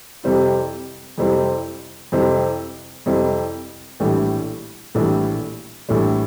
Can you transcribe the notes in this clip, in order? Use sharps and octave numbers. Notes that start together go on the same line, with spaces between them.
F2 C3 G3 C4 E4
F2 C3 G3 C4 E4
F2 C3 G3 C4 E4
F2 C3 G3 C4 E4
A#1 A2 E3 G3
A#1 A2 E3 G3
A#1 A2 E3 G3